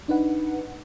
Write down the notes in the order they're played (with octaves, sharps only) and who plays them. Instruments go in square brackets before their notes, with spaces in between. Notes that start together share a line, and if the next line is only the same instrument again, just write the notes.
[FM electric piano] D4 D#4 B4 F#5